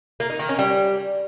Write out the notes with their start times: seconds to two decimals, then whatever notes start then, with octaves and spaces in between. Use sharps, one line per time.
0.20 A#3
0.30 D#4
0.39 D#3
0.49 C#4
0.59 G3